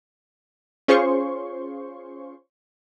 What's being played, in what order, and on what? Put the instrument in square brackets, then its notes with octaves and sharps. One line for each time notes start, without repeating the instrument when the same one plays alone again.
[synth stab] C#4 F4 G#4 C5 C6 C#6